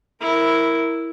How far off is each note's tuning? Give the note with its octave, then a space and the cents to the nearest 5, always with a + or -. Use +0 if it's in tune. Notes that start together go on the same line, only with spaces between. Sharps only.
E4 +0 A#4 +0